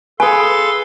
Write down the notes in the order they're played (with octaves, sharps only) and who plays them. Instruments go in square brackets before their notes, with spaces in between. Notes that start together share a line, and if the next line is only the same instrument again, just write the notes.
[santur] G#4 B4 [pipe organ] A4 F5 C6 [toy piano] G#5